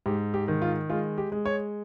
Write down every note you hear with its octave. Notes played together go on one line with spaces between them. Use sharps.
G#2 G4
G4
D#3
F4
G#3 F4
G4
G#3
C#5